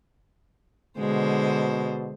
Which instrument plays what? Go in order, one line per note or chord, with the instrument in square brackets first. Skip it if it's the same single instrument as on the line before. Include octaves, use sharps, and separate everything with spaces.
[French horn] B2 [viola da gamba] D3 G#3 C5